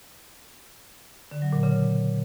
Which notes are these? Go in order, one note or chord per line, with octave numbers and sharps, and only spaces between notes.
D3
F#3
A#2
C#3